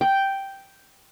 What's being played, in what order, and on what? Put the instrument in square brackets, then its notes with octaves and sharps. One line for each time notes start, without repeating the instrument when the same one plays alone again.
[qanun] G5